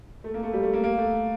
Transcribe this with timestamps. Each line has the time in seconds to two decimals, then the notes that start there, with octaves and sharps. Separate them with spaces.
0.24 A3
0.34 A#3
0.43 A3
0.53 G3
0.63 A3
0.73 A#3
0.84 A#3
0.98 A3